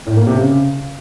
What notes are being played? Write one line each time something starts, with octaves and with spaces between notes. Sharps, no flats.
A2
A#3
C3
C#3